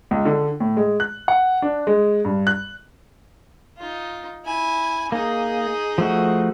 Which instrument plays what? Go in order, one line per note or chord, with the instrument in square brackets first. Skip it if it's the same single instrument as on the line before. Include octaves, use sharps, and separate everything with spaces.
[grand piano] C#2
D3
A2
G#3
F#6
F#5
D4
G#3
G2
F#6
[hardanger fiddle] D#4 F4
E4 G#5
[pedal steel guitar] A#3 [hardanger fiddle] D#4 G#4
[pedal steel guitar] F3 A3 F#4